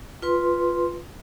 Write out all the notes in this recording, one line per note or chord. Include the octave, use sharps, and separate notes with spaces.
F4 B4 C6